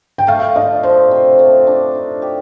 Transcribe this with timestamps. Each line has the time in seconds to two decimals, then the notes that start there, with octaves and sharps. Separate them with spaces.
0.18 G5
0.27 A3 F5
0.55 D4 D#5
0.83 F3 C5
1.11 C3
1.39 A3
1.67 D4
1.95 D#4
2.22 G4